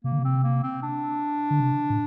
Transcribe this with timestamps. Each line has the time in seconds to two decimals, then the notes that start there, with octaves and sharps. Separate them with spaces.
0.04 C3 A#3
0.12 D3
0.19 C3
0.25 C4
0.44 A#3
0.63 C4
0.83 D4
1.50 D3
1.60 C3
1.90 A2